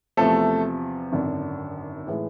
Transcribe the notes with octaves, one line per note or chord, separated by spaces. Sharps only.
E2 C3 F3 A3 A4
G#1 F#2 D3
A2 E3 G#3